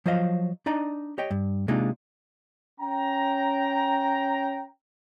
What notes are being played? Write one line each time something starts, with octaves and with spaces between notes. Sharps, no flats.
F3 F#3 F4 C5 D#5 F5
D4 D#4 D5 D#5 A#5
G4 C#5 D#5 G5
G2
C3 G#3 A#3 D4 D#4 F4
C#4 G5 A#5